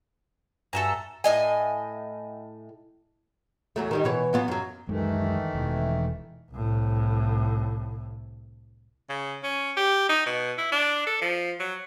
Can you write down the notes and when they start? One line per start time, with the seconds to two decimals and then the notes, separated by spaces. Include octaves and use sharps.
0.73 G2 F#4 A4 E5 G#5 A#5 E7
1.24 A2 D#5 G#5
3.76 E2 F#3 A3
3.91 D#3 G3 D#4
4.04 B2 E3 C#5
4.33 F#3 B3 F4
4.48 F#2 F#3
4.89 F#2 D#3 E3 G#3 A3
5.55 E1
6.52 C2 A2
9.10 C#3
9.43 C#4
9.77 G4
10.09 D#4
10.26 B2
10.58 E4
10.72 D4
11.07 A4
11.21 F3
11.60 F#3